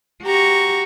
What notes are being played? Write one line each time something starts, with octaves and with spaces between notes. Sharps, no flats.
F#4 G4 A#5 C#6